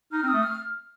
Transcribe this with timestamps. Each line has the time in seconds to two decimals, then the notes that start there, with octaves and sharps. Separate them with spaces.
0.12 D#4 F6
0.23 C4
0.28 D#6
0.33 A3
0.43 F6